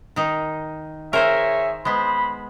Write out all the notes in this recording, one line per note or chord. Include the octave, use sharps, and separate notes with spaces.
D#3 D#4
G#4 A#4 C5 C#5 E5 G#5
G#3 B3 C5 B5